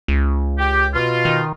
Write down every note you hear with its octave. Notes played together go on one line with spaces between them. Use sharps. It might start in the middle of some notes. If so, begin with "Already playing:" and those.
C#2
G4
B2 F4
D#3